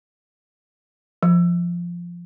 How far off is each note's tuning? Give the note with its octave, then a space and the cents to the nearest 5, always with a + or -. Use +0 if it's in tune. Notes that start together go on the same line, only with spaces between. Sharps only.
F3 -5